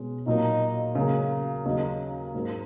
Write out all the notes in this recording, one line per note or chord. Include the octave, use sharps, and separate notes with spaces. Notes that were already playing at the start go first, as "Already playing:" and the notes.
Already playing: B2 G#3 C#4
A#2 F#3 A#3 D#4
C#3 F#3 A#3
D#2 C#3 F#3 A#3 C#4 D#4
G#2 F#3 A#3